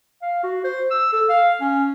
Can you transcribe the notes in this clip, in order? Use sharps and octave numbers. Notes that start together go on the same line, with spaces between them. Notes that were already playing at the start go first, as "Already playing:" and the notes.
F5
F#4
C5
E6
A4
F5
C#4